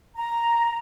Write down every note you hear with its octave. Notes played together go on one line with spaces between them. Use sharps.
A#5